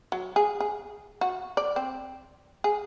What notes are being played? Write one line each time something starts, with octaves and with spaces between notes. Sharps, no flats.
F#3
G#4
G#4
F#4
D5
C4
G#4